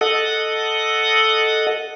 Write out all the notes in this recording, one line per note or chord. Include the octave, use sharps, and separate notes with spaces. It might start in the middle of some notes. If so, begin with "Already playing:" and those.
A4 D#5 F#5